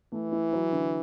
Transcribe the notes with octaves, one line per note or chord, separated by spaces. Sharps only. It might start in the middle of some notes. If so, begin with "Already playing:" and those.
E3 A3
E4
F#3
D3